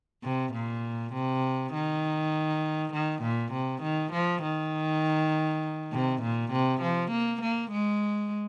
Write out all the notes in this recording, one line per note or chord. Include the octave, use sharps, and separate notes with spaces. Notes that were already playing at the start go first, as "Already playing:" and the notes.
C3
A#2
C3
D#3
D#3
A#2
C3
D#3
F3
D#3
C3
A#2
C3
F3
A#3
A#3
G#3